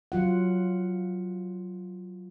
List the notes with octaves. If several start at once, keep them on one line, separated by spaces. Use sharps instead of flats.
F#3 F4 F#5